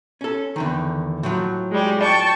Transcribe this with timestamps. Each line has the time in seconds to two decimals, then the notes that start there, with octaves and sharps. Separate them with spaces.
0.21 C#4 A4
0.56 E2 D3 D#3
1.23 A2 F3 F#3
1.71 G3 G#3
2.02 G5 A5 C#6